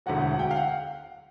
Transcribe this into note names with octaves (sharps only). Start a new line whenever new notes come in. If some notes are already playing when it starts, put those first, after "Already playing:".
E1 D2 D3 F#3 F#5
F#5
F#5
G5
F5
F#5